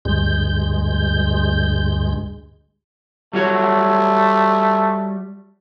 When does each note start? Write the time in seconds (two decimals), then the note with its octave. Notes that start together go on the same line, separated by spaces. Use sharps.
0.05 D2 G2 G#3 G6
3.33 G3 A3 F#4 C#5